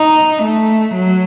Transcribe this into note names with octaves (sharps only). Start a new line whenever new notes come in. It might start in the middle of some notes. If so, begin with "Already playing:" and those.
Already playing: D#4
A3
F#3